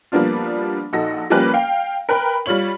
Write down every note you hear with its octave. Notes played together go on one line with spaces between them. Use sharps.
F3 G3 A#3 B3 D4 F4
A#1 D#4 F#4 A4 A#6
F3 G3 A#3 C#4 G4 B4
F5 G5
A#4 B4 G5 B5
G3 F4 C#5 F#7